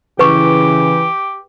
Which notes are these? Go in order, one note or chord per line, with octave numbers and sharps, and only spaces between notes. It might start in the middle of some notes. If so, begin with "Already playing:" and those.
C#3 E3 G4 B4 C#6